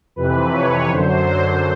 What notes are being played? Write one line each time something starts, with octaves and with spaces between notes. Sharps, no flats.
F2 C3 E3 B4
C#5
F#2 D3 F#3 C5